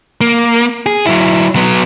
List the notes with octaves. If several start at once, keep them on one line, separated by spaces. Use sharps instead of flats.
A#3
G#4
F#3 E4
F#3 B3